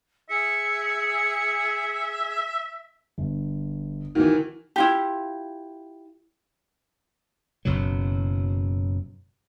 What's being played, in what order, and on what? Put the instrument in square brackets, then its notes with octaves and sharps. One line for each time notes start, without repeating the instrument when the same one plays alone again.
[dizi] G#4 [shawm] E5 [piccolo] C#7
[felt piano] G1
[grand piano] D#3 E3 [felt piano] F#4
[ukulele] E4 F4 G4
[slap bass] F#1 F#2 B2 F#3